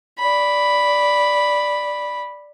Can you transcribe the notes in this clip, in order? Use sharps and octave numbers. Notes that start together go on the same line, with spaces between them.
D5 B5